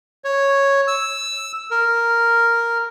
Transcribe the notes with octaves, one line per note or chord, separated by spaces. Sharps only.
C#5
E6
A#4